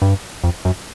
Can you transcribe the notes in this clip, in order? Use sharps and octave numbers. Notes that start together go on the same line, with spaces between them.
G2
F2
F#2